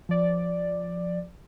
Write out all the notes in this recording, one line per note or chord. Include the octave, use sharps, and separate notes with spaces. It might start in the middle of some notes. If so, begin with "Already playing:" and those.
F3 D5